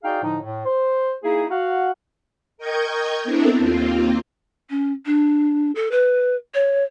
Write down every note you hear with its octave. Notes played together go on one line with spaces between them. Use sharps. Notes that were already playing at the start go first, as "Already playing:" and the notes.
D#4 F#4 G#4 D5 F5 G5
A2 D3 F3 D#4
A2
C5
A#3 D#4 E4 G#4
F#4 F5 F#5
A#4 D#5 G5 C#6 G6 G#6
B3 C4 D4 E4 A4 A#4
D#2 A#3 C4 F4
C#4
D4
A4
B4
C#5